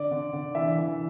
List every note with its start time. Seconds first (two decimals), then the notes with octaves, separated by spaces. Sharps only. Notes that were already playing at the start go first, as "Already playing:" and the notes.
Already playing: D3 D5
0.11 D3
0.33 D3
0.55 E3 E5
0.78 E3